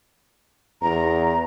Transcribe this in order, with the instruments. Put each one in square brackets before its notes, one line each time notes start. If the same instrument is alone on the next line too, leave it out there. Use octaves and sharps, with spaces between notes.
[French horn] E2 [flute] A#5